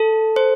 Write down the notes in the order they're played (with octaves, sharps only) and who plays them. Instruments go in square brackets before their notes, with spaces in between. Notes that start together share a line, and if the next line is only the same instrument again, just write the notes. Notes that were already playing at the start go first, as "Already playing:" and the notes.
Already playing: [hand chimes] A4 A5
C5